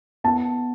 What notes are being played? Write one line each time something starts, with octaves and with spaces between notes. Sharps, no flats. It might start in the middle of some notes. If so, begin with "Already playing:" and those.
B3 A5